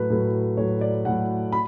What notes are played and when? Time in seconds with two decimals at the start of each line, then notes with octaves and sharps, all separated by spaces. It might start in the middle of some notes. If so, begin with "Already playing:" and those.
Already playing: A2 F#3 B4
0.10 A2 F#3
0.57 A2 F#3 C#5
0.81 D5
1.05 A2 F#3 F#5
1.52 B5